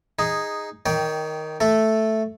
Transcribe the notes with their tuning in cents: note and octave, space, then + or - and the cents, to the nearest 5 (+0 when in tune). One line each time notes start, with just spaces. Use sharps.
D#4 +0 G#4 -10
D#3 +0 C#5 +40 G5 +0
A3 +0 A4 +0